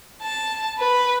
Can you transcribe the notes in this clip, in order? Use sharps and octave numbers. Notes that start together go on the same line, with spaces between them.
A5
B4